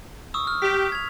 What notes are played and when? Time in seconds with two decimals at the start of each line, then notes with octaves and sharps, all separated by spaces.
0.34 C#6 D#6 E6
0.47 F6
0.62 G4 B6
0.92 G#6 F7